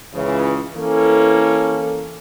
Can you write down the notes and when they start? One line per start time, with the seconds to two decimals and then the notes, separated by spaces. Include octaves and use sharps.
0.14 C#2 C#3 E3
0.76 E3 A#3 C#4 A4